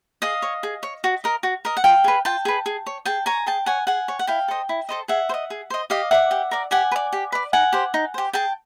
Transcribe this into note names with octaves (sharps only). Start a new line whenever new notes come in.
G#4 D#5 F5
C#5
G#4
C#5
F#4
A#4 D#5
F#4
A#4 D#5
F#5
F4 F5 G5
G#4 B4
F4 G5 A5
G#4 B4
G#4
C#5
G#4 G5 A5
C#5 G#5 A#5
G#4 G5 A5
C#5 F#5 G#5
G#4 F#5 G#5
C#5
F#5
E4 F5 G5
A4 C5 D#5
E4
A4 C5 D#5
G#4 E5 F#5
C5
D#5
G#4
C5 D#5
G4 D#5 F5
A#4 D5 E5 F#5
G4
A#4 D5
G4 F#5 G#5
B4
D5
G4
B4 D5
D#4 F#5 G#5
G4 C5
D#4
G4 C5
G#4 G5 A5